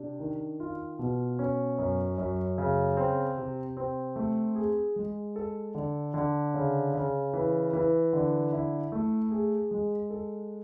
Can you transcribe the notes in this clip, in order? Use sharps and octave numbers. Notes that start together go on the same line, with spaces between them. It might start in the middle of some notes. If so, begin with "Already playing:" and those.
Already playing: C3 D4
D#3
F4
B2
C#4
F#2
F#2
C#3
C4
C3
C4
A3
G#4
G#3
A4
D3
D3
C#3
C#3
E3
E3
D3
E4
A3
G#4
G#3
A4